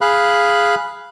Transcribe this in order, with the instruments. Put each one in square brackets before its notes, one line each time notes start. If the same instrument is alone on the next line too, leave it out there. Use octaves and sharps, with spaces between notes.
[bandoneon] G#4 F5 B5 F#6